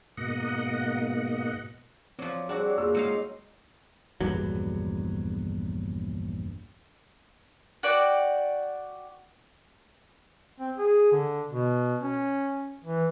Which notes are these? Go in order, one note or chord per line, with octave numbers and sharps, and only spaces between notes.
G#2 B2 A#3 D#5 F#5
F3 F#3 C4 D5
F#3 G3 C4 D4 F#4 G#4 D6
A#3 F4 G#4 E6
F#3 G#3 D#4 F5
A#1 E2 G2 F#3
F#4 D5 G5
C4
G#4
D3
B2
C#4
E3